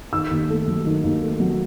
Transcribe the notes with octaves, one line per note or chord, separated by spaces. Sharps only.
D#3 E6
D#2
A3
F#3
D#3
D#2
A3
F#3